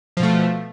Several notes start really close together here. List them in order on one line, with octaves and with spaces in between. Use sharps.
F3 B2 A3